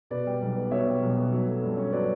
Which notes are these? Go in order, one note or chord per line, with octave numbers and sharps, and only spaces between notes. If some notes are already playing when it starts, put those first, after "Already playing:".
B2 B4 D5
G3
B1
B3
B2 C#5 E5
G3
B1
B3
F#3
A3
G2
C#4
F#3 B4 D5